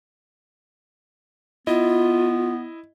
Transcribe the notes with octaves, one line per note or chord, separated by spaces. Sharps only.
B3 E4 F4 D#5